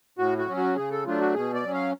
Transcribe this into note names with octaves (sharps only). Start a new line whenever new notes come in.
A2 F#4
F#4
F#3 C#4
F#4
C#3 G#4
A4
F#3 A3 D4 F4
F#4
B2 G#4
D5
F#3 C#4
F5